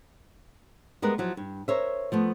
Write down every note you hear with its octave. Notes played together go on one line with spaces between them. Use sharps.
G3 G#3 B3 A#4 B4
F3 F#3 E4
G2
A#4 C5 C#5 E5
F3 A3 B3